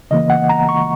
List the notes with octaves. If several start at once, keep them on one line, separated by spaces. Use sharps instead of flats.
C#3 E3 A#3 D#5
F#5
A#5
C#6